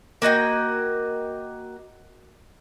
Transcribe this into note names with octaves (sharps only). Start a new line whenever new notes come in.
A#3 F#4 D#5 G5